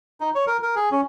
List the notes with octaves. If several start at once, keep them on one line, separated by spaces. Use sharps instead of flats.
D#4
C#5
A#4
A#4
G#4
C#4